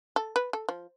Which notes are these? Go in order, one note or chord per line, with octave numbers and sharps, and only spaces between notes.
A4
B4
A4
F3